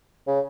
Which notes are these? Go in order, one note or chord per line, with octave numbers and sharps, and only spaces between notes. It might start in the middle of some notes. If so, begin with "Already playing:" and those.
C#3